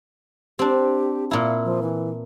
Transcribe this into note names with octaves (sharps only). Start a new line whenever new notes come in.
C4 D4 G4
A#2 E4 F5
F3
E3